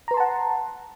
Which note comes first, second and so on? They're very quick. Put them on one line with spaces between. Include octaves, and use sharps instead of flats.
A#5 B4 C6 A5 F#5